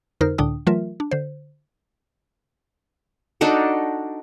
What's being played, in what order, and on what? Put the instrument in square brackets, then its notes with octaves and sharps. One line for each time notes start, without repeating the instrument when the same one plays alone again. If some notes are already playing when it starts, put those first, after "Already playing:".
[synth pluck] F2 D3 D#4 A#4 C5 F6
C#2 A2 D3 D4 G5 D#6
E3 F#3 A3 F4 A#4 E5
D4
D3 C5
[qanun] D4 D#4 F#4 A4